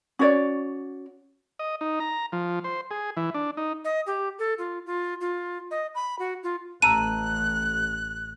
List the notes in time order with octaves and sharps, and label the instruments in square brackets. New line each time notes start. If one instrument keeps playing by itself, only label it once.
[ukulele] C#4 F#4 C#5 D5
[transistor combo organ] D#5
D#4
A#5
F3
C5
G#4
E3
D4
D#4
[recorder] D#5
G4
A4
F4
F4
F4
D#5
B5
F#4
F4
[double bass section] A1 [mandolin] A5 A#5 E6 [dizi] F#6 [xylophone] D#7